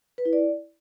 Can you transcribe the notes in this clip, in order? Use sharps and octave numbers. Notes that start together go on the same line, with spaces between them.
B4
E4
D5